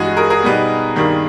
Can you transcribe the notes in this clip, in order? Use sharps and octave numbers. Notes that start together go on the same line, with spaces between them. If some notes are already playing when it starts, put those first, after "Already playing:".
Already playing: G2 E3 G#3 F#4 G#4
G#4 A#4
G#4 A#4
B2 G3 B3 D#4
G2 D#3 G3 A#3